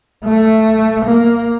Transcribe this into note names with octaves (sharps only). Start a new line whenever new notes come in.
A3
A#3